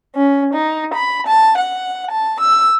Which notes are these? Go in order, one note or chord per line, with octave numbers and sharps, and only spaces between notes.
C#4
D#4
B5
A5
F#5
A5
E6